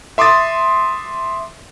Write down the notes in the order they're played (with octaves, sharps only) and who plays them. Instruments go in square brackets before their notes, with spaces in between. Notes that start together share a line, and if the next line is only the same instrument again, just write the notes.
[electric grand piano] E5 C6 D6 D#6 A6